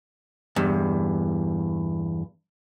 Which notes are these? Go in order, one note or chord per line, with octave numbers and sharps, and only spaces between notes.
E2 G2